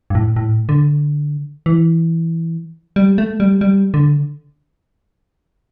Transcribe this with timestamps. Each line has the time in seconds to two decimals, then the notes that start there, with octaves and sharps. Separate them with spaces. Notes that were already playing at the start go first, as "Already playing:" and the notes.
0.10 G2
0.15 A2
0.36 A2
0.69 D3
1.66 E3
2.96 G3
3.18 A3
3.40 G3
3.61 G3
3.94 D3